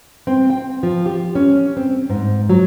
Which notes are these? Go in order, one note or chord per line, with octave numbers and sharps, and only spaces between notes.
C4
G5
F3
G4
C#4
C4
G#2
F#3